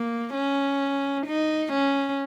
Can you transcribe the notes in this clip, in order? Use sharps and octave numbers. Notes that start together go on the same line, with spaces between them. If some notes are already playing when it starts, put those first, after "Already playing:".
Already playing: A#3
C#4
D#4
C#4